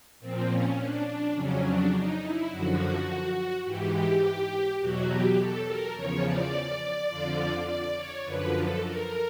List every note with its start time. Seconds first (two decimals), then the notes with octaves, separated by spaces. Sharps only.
0.20 A#2 F3 C4
0.48 C#4
0.78 D4
1.05 D4
1.34 F2 C#3 F#3 C#4
1.64 D4
1.92 D#4
2.21 E4
2.50 F#2 D3 F3 F#4
3.65 G#2 E3 G4
3.93 G4
4.79 E2 B2 F#3 F#4
5.08 G4
5.37 A4
5.66 A#4
5.94 E2 C#3 F3 C#5
6.24 D5
7.09 F2 D3 F3
7.67 D5
7.96 C#5
8.24 F#2 D3 F3 B4
8.53 A4
8.81 A#4